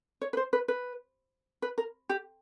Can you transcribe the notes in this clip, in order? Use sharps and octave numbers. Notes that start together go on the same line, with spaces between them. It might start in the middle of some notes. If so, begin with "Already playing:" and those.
C#5
B4
C5
B4
B4
B4
A#4
G4